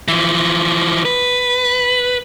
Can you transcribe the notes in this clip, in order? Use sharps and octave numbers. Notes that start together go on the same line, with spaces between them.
E3 F3
B4